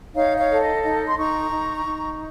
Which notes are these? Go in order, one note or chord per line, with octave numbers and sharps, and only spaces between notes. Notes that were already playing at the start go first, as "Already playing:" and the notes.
D#4 C#5 F5
C#5 F5
A4
D#5
D#4 D#5
C6
D#4 A#5 C#6
D#4
D#4